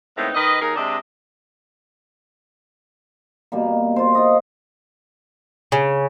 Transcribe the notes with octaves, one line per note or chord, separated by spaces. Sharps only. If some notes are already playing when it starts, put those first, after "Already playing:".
A2 G#3 B3 C4 D#4
D#3 B4 D#5
D#2 D#4 G#4 A#4
C3 G#3 D4 D#5
B2 G3 A#3
F4 C5
F4 D#5
C#3